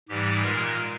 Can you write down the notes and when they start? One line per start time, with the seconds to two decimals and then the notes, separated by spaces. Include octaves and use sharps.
0.09 G#2 E3 G3 G4
0.43 A#2 G#3 A#4